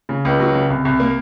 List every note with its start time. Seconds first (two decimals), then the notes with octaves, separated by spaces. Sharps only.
0.09 C#3
0.25 C#2
0.40 F#3
0.54 C#3
0.70 C2
0.85 C2
1.00 A#3